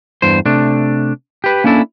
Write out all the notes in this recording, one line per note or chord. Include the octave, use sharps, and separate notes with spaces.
E2 G2 C5
C3 A3 D4
G4 B4
A#3 C#4 D4 E4 A4